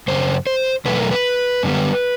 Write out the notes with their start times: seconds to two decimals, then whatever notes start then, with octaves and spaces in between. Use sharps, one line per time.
0.08 F#2 C#3 C5
0.47 C5
0.85 E2 B2 F#3 A3 B4
0.98 A#4
1.11 B4
1.63 F#2 D3 G3 B3